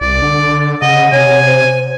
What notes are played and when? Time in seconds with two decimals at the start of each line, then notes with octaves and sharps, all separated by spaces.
0.01 C2 D5
0.22 D3
0.82 C#3 D#5 F#5
1.12 C3 C#5 G#5
1.46 C5